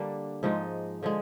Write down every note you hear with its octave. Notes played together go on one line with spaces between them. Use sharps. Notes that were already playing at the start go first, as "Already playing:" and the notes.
Already playing: D3 G3 A#3 D4
G#2 F3 G#3 D#4
D3 F3 G#3